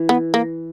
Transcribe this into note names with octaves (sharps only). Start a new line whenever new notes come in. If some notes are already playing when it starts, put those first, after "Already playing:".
Already playing: E3
B3
A#3